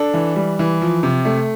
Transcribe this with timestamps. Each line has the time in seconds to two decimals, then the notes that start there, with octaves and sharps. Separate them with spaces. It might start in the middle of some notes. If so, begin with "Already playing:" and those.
Already playing: D4 A4
0.14 E3
0.36 G3
0.59 E3
0.81 F3
1.03 C3
1.25 A3